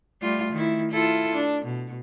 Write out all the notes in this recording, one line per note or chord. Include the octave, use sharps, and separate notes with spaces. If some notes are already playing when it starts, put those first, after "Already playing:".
G3 A3 F4
D#3 E4
E4 F4 A4
D4
B2